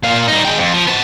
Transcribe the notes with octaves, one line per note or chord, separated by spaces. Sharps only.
A#2 F5
G3 D#4
G#3 G5
F2
F3
B3 A5